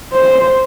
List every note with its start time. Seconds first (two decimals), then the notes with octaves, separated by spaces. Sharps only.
0.13 C5